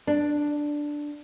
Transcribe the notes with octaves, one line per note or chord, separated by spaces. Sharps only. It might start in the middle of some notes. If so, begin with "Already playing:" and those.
D4